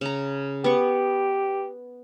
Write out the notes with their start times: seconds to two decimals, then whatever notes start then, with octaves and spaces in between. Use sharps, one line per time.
0.01 C#3 A#5
0.64 B3 G4 C#6